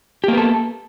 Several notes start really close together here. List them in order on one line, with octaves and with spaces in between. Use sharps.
G4 A#3 B3 A4